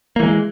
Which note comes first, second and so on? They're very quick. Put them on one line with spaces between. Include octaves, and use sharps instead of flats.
A#3 E3 G#3